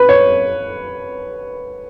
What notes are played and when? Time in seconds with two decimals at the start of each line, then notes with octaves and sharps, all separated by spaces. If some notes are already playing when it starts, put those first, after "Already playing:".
Already playing: B4
0.09 C#5